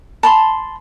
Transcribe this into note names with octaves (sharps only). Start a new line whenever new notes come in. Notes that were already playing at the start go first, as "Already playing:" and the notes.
A5 B5 C6